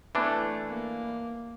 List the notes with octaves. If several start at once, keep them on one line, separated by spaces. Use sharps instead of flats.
E3 A3 D4
A#3